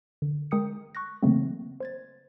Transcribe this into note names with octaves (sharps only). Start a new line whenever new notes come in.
D3
G#3 A#4 G5 D#6 G6 C#7
C#6 F#6 A#6
C#3 E3 F#3 A3 A#3 C4
C5 G#6 A6